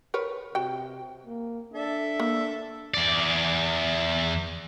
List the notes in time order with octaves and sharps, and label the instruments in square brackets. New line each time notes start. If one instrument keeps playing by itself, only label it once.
[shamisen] A#4 B4 C#5
[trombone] C3 [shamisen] F#4 G5
[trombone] A#3
[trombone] D4 [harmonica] A4 D5 E5
[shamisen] A#3
[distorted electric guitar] E2 D5